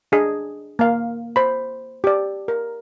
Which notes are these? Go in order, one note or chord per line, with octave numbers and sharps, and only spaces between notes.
D4 G#4 D#5
A#3 F5
C5 B5
G4 D5
A#4